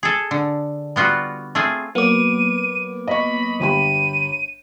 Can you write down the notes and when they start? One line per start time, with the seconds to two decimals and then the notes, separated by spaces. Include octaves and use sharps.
0.03 G#4 A4
0.31 D3
0.96 G3 B3 F4 F#4
1.55 A3 C4 F4 G#4
1.95 F#3 A#3 B3 B4 D6 D#7
3.08 D#5 B5 C#6
3.60 G1 G4 B5 D#7